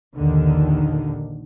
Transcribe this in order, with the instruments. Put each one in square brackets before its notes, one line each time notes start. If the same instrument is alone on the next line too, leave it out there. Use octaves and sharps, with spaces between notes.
[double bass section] A#1 D#2 D3 D#3